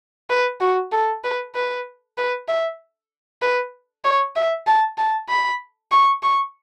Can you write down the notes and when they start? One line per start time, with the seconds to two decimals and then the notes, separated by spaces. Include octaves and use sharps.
0.30 B4
0.61 F#4
0.92 A4
1.24 B4
1.55 B4
2.18 B4
2.48 E5
3.42 B4
4.04 C#5
4.36 E5
4.67 A5
4.98 A5
5.29 B5
5.92 C#6
6.23 C#6